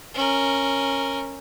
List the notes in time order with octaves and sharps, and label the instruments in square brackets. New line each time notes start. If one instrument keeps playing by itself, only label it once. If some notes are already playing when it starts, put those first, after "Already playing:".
[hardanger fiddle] C#4 A#4